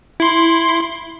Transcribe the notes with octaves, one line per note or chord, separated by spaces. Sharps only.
E4 C6